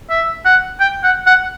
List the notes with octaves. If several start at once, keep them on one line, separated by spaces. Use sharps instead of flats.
E5
F#5
G5
F#5
F#5